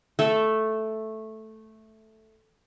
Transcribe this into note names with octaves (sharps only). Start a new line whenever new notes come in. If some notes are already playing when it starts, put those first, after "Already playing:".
A3 A4